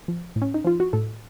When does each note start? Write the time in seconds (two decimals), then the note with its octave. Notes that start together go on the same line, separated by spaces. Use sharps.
0.08 F3
0.36 A2
0.42 C#4
0.54 D#4
0.65 F3 F4
0.80 F#4
0.93 A2 A4